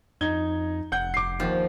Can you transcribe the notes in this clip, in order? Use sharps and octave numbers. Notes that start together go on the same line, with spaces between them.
F2 D#4 G#6 G7
F1 F#5 G6
D6 C7
D#2 F3